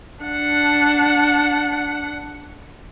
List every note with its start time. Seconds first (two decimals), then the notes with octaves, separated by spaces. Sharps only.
0.24 D4 F#5